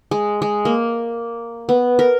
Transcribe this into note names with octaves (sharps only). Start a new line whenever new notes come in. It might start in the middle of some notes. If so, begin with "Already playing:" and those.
G#3
G#3
A#3
B3
A#4